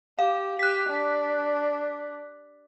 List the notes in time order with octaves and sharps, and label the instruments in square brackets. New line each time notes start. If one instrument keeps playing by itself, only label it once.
[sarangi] G4 [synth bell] F5
[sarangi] G4 [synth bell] F#6 B6
[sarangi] D4